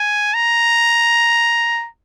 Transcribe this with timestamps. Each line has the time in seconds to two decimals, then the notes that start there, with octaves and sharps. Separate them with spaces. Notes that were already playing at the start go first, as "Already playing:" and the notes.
Already playing: G#5
0.34 A#5